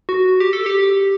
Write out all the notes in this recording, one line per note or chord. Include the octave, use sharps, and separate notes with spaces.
F#4
G4
A4
G4